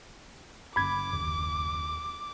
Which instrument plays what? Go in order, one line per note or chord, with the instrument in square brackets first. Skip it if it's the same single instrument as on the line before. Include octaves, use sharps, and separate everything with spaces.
[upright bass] F#1 F#2 [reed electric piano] B5 G#6 [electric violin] D6
[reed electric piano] D#2